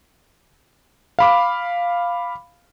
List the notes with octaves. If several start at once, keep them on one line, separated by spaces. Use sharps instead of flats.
F5 B5 D6